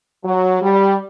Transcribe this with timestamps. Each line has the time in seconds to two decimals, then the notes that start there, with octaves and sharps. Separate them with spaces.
0.25 F#3
0.62 G3